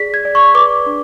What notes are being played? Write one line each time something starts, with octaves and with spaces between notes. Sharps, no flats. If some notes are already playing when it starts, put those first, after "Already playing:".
Already playing: G#4 D5 B6
G#6
D5
C#6
B4 D6
D4